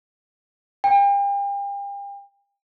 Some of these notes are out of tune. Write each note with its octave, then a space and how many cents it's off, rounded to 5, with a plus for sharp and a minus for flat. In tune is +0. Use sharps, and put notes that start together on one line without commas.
G5 +40